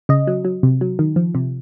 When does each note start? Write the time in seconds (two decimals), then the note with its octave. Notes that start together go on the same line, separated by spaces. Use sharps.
0.09 C#3 D#5
0.27 F#3
0.45 F#3
0.63 C3
0.81 F#3
0.99 D#3
1.16 F3
1.35 C3